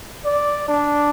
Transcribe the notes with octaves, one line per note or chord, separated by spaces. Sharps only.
D5
D4